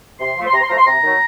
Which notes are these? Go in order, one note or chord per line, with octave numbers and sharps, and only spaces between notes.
C3 C6
F3 A3
C6
C3 A#5
C6
F3 A3 A#5
C6
C3 A#5
D#3 F#3 A3